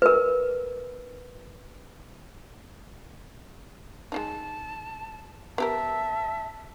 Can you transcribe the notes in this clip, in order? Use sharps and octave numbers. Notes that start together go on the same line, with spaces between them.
A#4 B4
G#3 D4 D#4 A5
B3 G4 A#4 E5 A5